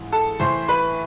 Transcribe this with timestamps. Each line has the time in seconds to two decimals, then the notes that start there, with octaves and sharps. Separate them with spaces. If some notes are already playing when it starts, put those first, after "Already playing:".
Already playing: G#2 E3
0.12 A4 A5
0.40 A2 E3 C5 C6
0.68 B4 B5